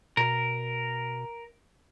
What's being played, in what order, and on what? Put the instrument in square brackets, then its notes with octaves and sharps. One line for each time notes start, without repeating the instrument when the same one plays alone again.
[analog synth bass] B2 [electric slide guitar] A#4